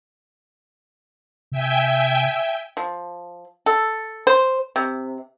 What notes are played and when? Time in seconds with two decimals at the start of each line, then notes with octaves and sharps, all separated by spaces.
1.52 C3 E5 G5 G#5
2.77 F3
3.66 A4
4.27 C5
4.76 C3